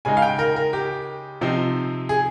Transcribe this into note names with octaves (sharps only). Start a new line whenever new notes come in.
C#3 G#3 D#4 G#5
F5
G5
A#4
A#4
G4
C3 F3 C4 D#4
G#4